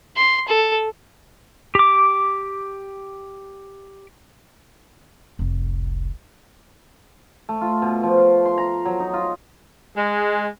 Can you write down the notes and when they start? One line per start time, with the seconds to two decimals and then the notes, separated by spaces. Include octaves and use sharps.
0.16 C6
0.48 A4
1.75 G4 D6
5.39 F1 C2
7.49 A3
7.61 F4
7.82 B2
8.03 F3
8.17 F5
8.45 C6
8.58 A#5
8.85 F#3
9.00 D#4
9.14 F4
9.96 G#3